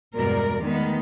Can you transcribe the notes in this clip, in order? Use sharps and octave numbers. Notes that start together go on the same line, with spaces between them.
E2 G2 B2 G#3 A#4 D5
D#3 G#3 A3 B3